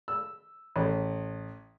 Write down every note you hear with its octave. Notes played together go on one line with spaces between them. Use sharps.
E6
A1